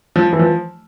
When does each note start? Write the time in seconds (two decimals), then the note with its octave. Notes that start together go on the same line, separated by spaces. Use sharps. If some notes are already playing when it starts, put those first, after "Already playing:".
0.16 F3
0.33 E3
0.39 F3